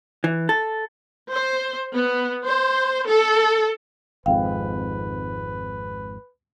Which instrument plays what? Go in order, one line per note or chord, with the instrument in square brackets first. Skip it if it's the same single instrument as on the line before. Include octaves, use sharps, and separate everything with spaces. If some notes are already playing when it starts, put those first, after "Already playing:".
[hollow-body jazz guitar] E3
A4
[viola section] C5
B3
C5
A4
[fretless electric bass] G#1 F2 G#2 [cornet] B4 [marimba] F5 G5